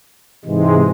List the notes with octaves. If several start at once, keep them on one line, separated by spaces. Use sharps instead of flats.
G#2 C3 E3 G#3